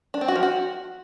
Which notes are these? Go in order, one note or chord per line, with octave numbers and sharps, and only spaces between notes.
D4
C4
F#4
F3
F#4